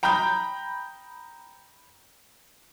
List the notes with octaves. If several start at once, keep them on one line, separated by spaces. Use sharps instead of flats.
G5 A#5 B5 D#6 G6